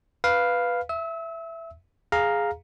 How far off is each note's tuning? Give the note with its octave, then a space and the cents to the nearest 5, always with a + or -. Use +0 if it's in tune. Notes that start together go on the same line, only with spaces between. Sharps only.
B4 +0 F5 +0
E5 +10 E6 -35
G#4 +0 F5 +5 A#5 +0